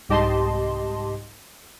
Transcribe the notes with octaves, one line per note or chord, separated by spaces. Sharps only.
C2 G#2 G4 D#5 A5 C6